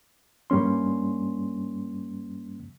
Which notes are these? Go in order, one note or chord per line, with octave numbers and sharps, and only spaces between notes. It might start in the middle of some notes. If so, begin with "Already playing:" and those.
G2 G3 A#3 C#4 C6